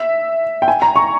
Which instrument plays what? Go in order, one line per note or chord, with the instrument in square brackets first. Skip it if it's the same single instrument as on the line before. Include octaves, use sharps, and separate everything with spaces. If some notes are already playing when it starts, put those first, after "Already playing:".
Already playing: [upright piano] E5
G5
G#5
A#5
C#6